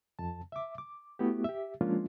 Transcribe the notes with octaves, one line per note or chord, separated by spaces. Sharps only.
F2 A5
E5 D6
D6
A3 B3 E4 F#4 G4
G4 E5
F3 G#3 A#3 C#4 D4 F4